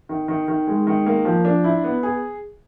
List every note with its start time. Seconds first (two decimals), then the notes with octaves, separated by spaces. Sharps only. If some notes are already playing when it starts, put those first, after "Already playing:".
0.09 D#3
0.28 D#3
0.48 D#3
0.67 G#3
0.87 D#3
1.06 A#3
1.25 F3
1.45 D4
1.64 E4
1.84 B3
2.03 G#4